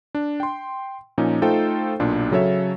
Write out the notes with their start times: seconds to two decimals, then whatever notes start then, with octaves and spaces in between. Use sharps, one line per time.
0.15 D4
0.40 G5 C6
1.18 A#2 F3 C#4 D#4
1.42 A3 D#4 F4 A4 C5 G5
2.00 B1 A#2 D4 F4
2.31 C#3 F#3 A4 C#5 E5